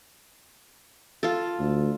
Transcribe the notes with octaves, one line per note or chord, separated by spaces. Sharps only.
F4 A4
D2